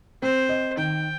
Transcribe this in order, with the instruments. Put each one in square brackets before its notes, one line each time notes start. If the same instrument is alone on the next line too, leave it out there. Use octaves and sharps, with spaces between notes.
[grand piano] C4 [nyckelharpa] C5
[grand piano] D#5
[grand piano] D#3 [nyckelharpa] G5